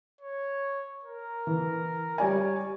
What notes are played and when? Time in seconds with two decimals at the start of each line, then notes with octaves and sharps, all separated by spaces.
0.21 C#5
1.03 A#4
1.47 E3
2.18 G3 C#5 D5 G#5